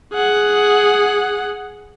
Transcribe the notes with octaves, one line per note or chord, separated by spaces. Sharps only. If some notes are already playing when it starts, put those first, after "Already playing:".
G#4 F#5